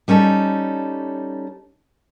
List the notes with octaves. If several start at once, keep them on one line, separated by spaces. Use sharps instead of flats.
G3 C#4 D#4 A4